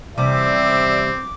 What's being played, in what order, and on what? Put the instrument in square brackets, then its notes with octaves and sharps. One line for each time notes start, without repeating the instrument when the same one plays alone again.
[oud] E2 C3 G3 [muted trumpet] C4 [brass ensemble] D5 E5 [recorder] D6